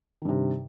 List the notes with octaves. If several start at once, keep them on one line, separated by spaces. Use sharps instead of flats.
G2 C3 D#3